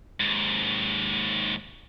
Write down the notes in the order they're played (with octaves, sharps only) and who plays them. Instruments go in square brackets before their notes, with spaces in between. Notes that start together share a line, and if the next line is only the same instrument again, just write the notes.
[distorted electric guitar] D#2 G#2